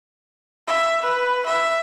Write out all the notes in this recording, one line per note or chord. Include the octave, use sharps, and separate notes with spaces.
E5
B4
E5